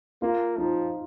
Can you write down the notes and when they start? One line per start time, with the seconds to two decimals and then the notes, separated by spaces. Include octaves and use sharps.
0.22 A#3 F4
0.58 F3 D#4